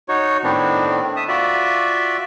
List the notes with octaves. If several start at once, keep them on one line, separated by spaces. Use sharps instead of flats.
D#4 F#4 C#5
A2 D#3 B3 C4 D4
E5 A5 D#6
F4 F#4 D5 E5